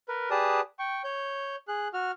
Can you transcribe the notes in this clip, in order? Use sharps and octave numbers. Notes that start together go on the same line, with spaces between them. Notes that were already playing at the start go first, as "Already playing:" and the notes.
A#4 B4
G4 G#4 B4 D5 A5 D#6
G5 C#6
C#5 G6
G#4 F#6
F#4 F6